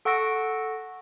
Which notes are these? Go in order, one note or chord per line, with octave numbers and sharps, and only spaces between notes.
A4 F#5 C#6 E6 A#6 D7